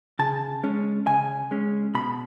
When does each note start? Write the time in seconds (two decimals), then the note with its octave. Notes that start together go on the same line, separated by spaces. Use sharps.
0.19 C#3 A5
0.63 G#3 C#4
1.07 C#3 G#5
1.51 G#3 C#4
1.95 B2 B5